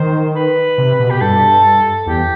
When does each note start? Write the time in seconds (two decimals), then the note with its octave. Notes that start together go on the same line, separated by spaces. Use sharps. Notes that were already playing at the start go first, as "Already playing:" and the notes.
Already playing: D#3 C5
0.35 B4
0.78 C3
1.00 B2
1.10 G4
1.21 G2 A4
2.06 E2 G4